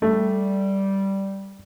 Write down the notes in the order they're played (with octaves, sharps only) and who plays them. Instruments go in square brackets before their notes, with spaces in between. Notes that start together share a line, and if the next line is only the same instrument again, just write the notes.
[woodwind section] G3 [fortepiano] A3